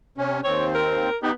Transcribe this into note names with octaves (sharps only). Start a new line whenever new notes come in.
C3 C#4
D#2 C4 C#5
A#4
B3 D#4 G4